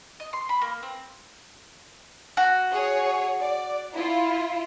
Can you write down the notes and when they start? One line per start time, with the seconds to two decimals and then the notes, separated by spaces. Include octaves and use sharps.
0.20 D#5
0.33 C6
0.49 B5
0.61 A#3
0.83 C4
2.37 F#4
2.72 G#4 C#5
3.41 D5
3.94 E4 F4